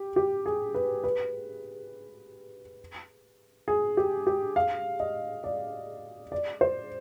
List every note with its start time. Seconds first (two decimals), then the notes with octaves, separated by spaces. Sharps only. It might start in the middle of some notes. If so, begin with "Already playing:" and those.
Already playing: G4
0.16 G4
0.46 G#4
0.74 B4
1.04 B4
3.68 G#4
3.97 G4
4.27 G4
4.56 F5
5.00 D#5
5.44 D5
6.32 D5
6.61 C5